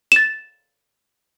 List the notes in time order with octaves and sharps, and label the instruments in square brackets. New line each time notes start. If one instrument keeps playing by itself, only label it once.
[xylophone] A6 E7